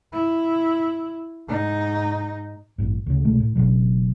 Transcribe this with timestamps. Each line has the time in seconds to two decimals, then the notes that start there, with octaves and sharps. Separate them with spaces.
0.12 E4
1.48 G#2 D#4
2.78 A1 G2
3.06 D2 C#3
3.25 C2 B2 G#3 A3
3.40 A2
3.55 F#1 D#2 B2 F#3